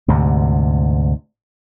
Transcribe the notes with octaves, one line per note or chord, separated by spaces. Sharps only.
D2 G#2 C3